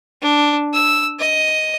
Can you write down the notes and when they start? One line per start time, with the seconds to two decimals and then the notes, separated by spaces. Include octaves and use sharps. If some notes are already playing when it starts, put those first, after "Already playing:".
0.22 D4
0.74 E6
1.20 D#5